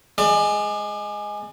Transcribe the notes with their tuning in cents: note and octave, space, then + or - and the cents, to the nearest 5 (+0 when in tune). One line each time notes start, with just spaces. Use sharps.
G#3 +0 D5 +35